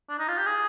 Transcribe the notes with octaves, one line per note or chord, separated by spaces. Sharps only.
D4
D#4
F4
G4
G#4